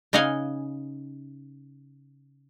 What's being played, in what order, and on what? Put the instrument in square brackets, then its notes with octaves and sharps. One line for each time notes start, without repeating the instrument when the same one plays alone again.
[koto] C#3 D#4 D#5 F5 F#5 G#5